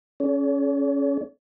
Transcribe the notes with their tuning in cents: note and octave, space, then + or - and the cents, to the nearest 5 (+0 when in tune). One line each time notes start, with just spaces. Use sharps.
C#4 +0 G#4 +45 C#5 +45